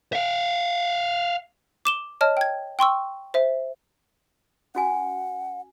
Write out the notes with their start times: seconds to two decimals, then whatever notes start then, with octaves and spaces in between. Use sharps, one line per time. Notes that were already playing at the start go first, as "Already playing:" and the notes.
0.13 E5 F5
1.85 D6 E7 G7
2.21 C#5 D#5 A5 F6
2.37 G5 G#6
2.79 G5 C6 C#6 E6
3.34 C5 E5
4.75 C#4 F#4 F#5 G#5